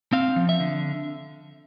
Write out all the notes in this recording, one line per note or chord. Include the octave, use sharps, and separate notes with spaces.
C4 F5
F3
E5
D3